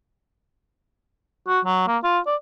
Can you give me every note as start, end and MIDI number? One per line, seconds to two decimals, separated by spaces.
1.47 1.60 66
1.65 1.86 54
1.87 1.98 58
2.03 2.19 65
2.26 2.36 74